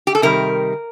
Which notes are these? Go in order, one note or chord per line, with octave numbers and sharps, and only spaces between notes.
G4
A4
C3 D#3 G3 A#4